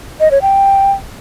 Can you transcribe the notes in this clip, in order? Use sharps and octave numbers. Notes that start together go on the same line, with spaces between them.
D#5
C#5
G5